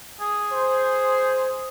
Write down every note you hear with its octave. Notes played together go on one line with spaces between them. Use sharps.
G#4
C5